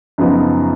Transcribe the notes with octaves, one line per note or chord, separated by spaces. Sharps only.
F#2 C#3 F3 B3 D#4